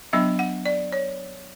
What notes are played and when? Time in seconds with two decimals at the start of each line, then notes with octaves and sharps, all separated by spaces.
0.13 F#3 B3 D4 E5
0.39 F#5
0.66 D5
0.92 C#5